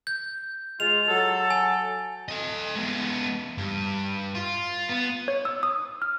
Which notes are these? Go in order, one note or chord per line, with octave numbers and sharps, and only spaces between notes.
G6
G#3 F4 F7
F#3 A4
G#5
A4 D#5
G#3 B3
G2
F4
B3
C#5
E6
D#6
F6